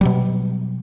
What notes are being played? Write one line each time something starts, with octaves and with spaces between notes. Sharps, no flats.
B2 F#3 G3